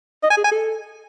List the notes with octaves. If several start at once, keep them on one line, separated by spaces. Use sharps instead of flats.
D#5
G#5
G#4
G#5
A4